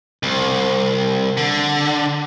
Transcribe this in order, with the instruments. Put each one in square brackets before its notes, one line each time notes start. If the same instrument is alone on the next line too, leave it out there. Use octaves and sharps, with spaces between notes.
[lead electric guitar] C2
D3